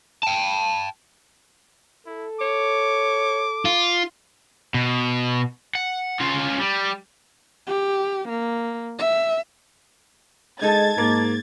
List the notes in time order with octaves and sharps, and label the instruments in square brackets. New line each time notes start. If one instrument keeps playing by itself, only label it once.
[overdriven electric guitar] G5 A5
[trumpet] E4 [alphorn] A4
[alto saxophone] C#5 [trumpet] D6
[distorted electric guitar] F4
[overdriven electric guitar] B2
F#5
C#4 F4
G3
[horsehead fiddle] G4
A#3
E5
[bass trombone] G#3 [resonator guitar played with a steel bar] D#4 A4 [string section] G#6 A6
[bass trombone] G#2 [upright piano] A#3